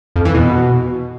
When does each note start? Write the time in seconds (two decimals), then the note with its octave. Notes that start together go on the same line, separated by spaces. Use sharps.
0.16 F2
0.25 E3
0.35 B2